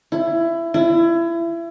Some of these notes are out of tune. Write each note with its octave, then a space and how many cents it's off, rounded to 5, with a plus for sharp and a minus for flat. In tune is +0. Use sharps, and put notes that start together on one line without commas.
E4 +20
E4 +30